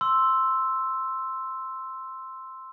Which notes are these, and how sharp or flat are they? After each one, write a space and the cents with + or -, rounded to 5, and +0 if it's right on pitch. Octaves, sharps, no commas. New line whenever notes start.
C6 +0 E6 +0